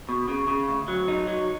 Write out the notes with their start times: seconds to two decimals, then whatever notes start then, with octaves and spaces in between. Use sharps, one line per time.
0.09 B2
0.28 C#3
0.48 C#3
0.68 D2
0.88 F#3
1.08 D#4
1.27 F#3